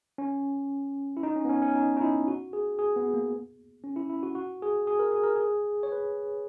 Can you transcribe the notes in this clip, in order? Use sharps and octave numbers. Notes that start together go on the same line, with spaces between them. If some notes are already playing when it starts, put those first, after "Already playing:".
C#4
E4
D#4
C#4
B3
C#4
C#4
D#4
D#4
E4
F#4
G#4
G#4
B3
A#3
C#4
E4
E4
F#4
F#4
G#4
G#4
A#4
G#4
A#4
G#4
C#5
B4